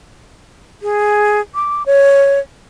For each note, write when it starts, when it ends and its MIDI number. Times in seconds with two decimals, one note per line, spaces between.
0.82 1.41 68
1.55 1.83 86
1.86 2.39 73